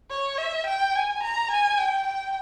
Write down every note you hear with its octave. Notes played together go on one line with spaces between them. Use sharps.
C#5
E5
G5
G#5
A#5
G#5
G5
G5